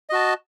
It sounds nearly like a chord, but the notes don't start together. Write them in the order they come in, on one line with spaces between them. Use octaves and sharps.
D#5 F#4 A5